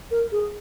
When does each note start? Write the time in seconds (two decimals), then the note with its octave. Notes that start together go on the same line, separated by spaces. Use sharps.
0.11 A#4
0.32 G#4